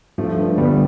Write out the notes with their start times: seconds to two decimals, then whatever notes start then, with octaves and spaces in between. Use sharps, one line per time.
0.18 G2 F3 A3
0.38 G2
0.58 D3 G3 B3